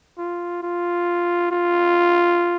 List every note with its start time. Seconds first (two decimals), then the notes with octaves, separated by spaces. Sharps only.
0.18 F4
0.63 F4
1.51 F4